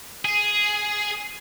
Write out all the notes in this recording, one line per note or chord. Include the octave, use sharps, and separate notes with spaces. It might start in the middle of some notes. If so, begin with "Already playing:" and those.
G#4